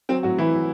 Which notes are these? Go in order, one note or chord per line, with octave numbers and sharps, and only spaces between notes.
F#3 C4
A2 F#3 F#4
E3 F#3 E4
F#3